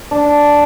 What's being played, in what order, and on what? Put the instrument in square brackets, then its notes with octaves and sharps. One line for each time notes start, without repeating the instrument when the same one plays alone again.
[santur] D4